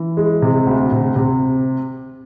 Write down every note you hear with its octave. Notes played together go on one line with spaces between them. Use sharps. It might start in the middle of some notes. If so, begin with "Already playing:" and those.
Already playing: E3
G#3
C3
D2
C3
C3